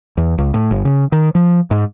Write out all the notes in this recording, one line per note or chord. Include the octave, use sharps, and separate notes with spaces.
E2
C#2
A2
G1
C#3
D#3
F3
G#2